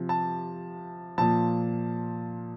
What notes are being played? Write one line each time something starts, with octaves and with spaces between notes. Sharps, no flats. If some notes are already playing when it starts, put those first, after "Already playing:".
Already playing: C3 F3
A5
A#2 F3 A5